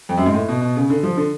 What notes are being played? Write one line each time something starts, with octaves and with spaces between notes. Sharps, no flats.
F2
F#2
G#2
A2
B2
B2
C#3
D3
F3
D3